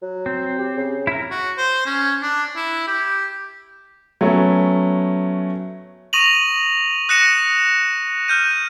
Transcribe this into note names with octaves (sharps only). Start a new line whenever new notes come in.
F#3
C4
G4
C#3
E4 A#4
F#4
C5
C#4
D4
E4
G4
F#3 A3 B3 C#4
C#6 D#6 A#6 D#7 F7 F#7
D#6 F#6 A#6 C#7 E7
F6 G6 D#7